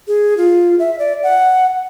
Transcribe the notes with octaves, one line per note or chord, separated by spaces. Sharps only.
G#4
F4
E5
D5
F#5